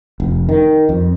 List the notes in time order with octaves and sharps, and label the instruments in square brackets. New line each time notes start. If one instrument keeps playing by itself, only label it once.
[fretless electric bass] F1
D#3
F2